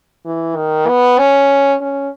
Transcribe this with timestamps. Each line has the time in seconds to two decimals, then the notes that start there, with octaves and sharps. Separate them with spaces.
0.25 E3
0.56 D#3
0.87 B3
1.19 C#4
1.81 C#4